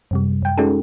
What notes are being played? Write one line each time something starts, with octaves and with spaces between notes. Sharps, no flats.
F#2 C3 G3
F#2 G5
G#3 C#4 D#4 F#4 G#4 A4